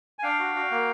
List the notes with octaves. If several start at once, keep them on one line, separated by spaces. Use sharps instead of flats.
G#5
D4 F5 G5
F#4
F#4
A#3